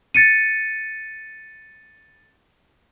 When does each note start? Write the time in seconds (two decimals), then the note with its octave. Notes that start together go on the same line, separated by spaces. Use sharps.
0.15 A6 C#7 D#7